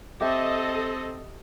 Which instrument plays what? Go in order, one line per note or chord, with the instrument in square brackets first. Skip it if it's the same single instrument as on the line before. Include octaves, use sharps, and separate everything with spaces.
[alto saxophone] C4 [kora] G4 E5 [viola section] A4 D#5